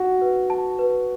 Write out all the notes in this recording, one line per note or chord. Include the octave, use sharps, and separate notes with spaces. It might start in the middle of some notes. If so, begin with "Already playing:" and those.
Already playing: F#4
B4
A5
B4